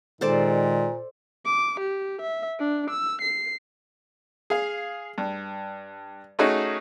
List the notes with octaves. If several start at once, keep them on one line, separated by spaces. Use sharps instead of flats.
A#2 D#3 G#3 A4 C5 D5
D6
G4
E5
D4
E6
C7
G#4 F5
G2
A3 C#4 D#4 F#4 G#4